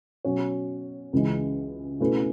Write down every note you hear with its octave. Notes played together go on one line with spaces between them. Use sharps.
B2 F#3 C#4 F#4 C#5
C#2 C#3 E3 G#3
B2 A3 C#4 E4 B4